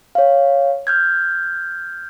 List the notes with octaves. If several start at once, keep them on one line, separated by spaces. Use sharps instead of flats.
C#5 F5
F6 G6 G#6